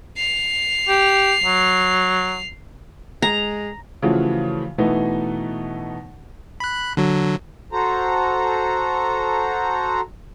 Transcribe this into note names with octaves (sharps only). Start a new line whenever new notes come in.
C7 F7
G4
F#3
G#3 A#5
C#3 E3 F3 A3 F4 F#4
B2 E3 A3 B3 D#4
B5 F#6
D3 F#3
F#4 A4 C5 A#5